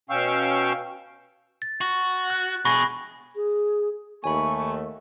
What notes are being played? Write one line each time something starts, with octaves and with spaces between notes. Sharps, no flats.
B2 C#4 F5 G5 C#6 E6
A6
F#4
F#6
B2 G#4 B5 C#6 A#6
G#4
D#2 A3 G#5 B5 C#6